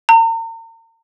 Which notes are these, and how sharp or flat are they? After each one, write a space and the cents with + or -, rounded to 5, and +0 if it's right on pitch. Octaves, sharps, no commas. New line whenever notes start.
A#5 -40